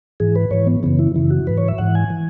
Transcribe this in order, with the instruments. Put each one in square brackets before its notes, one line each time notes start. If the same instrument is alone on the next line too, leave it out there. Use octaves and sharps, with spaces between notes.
[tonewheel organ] G#2 E3 G#4
B4
G#2 E3 C#5
B3
F#2 C#3 E3 B3
E4
F#2 C#3 E3 E4
F#4
G#2 E3 B4
C#5
E5
G#2 E3 F#5
G#5
E3